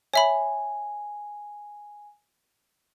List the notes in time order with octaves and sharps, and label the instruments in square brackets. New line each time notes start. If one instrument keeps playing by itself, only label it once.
[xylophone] C#5 E5 B5 [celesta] G#5